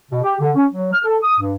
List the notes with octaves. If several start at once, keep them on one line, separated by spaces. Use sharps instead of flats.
B2
G4
D3
C#4
F#3
F6
A4
D#6
G2